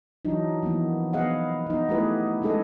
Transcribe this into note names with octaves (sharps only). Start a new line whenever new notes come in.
E3 F#3 D4 D#4
E3 F3 A#3 B3
B3 D#4 G#4 D#5 F5 F#5
B3 D#4
A3 B3 E4 G4 G#4 B4
G#3 C#4 D#4 G#4 A4 D#5